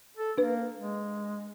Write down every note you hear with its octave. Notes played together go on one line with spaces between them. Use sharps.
A4
A#3 D4 B4
G#3